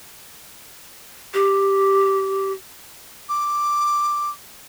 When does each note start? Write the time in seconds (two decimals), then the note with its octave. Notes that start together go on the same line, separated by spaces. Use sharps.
1.34 G4
3.29 D6